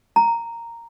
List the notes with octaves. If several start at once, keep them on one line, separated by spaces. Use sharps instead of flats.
A#5